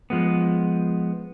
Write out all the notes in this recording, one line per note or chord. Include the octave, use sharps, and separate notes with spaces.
F3 G#3 B3